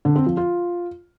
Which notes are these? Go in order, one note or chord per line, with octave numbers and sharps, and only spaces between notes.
D3
C4
F3
F4